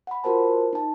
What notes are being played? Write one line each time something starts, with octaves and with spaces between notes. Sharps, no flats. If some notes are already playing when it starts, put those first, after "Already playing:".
F#5 B5
F4 F#4 A#4 C5 A5
D#4 A5